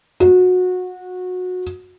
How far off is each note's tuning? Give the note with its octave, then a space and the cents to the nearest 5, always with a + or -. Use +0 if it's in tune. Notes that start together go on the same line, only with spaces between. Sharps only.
F#4 -25